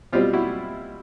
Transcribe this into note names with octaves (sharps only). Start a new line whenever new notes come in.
B2 G3 C4 F4 G4
E4 F#4